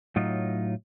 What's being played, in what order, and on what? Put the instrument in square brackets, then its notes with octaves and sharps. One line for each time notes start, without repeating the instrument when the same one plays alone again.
[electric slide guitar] A2 F#3 D#4 F4